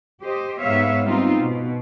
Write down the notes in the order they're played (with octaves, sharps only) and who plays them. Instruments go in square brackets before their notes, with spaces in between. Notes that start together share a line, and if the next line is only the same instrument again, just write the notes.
[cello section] G4 C5 D#5
G#2 B3 C#5 E5 F5
G3 B3 C4 D#4 F4
B2